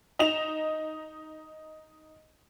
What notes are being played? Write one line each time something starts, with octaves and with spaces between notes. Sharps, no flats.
D#4 D#5 E7 F7